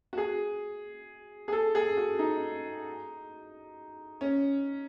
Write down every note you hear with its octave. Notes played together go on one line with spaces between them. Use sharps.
F#4
G#4
G#4
A4
G#4
F#4
D#4
C#4